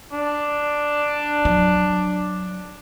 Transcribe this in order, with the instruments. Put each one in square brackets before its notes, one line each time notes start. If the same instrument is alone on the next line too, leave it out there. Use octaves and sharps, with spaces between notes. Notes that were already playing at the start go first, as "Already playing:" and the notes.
[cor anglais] D4
[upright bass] F#3